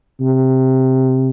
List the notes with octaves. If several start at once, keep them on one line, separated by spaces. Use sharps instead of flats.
C3